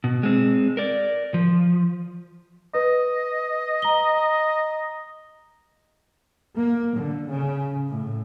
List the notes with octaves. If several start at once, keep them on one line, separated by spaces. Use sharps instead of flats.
B2
G#3 C4
A#4 D5
F3
B4 D#5
A#5 G7
A#3
D3
C#3
A2